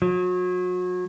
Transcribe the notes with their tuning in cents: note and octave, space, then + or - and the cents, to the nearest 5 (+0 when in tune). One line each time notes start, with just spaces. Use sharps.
F#3 -35